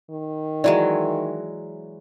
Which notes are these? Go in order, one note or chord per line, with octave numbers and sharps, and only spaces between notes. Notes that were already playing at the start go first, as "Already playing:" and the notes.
D#3
E3 F#3 G#3 D5